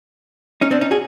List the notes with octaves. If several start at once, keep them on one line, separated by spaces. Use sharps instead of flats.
C#4 D#4
C4 D4
C#4 D#4
F#4 G#4